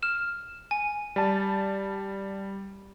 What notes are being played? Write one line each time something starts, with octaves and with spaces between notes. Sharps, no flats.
F6 E7
G#5
G3 A5